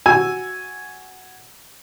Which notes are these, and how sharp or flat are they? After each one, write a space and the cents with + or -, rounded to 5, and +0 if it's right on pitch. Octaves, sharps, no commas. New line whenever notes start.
F#4 +0 G#5 +0 E6 +0